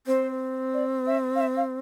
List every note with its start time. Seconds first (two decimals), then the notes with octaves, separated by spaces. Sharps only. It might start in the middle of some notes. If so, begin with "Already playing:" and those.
0.07 C4 C5
0.74 D5
1.07 E5
1.35 F5
1.40 E5
1.57 F5